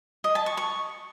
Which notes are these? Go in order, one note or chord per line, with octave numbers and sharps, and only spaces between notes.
D#5
A5
C#6
C#6